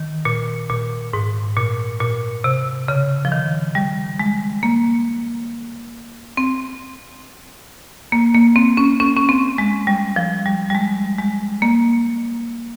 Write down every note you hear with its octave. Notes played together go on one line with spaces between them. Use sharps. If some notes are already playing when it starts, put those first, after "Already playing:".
Already playing: D#3
A#2
A#2
G#2
A#2
A#2
C3
C#3
F3
D#3
G3
G#3
A#3
C4
A#3
A#3
C4
C#4
C#4
C#4
C4
G#3
G3
F3
G3
G3
G#3
G#3
A#3